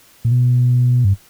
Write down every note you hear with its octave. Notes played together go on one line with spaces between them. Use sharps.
A#2
B2
G2